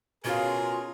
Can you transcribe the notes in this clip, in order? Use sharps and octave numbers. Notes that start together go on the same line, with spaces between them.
B2 C#4 F4 G#4 A#4 F5